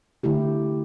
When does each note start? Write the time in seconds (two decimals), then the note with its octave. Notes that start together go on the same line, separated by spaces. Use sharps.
0.23 D3 A3 E4 G4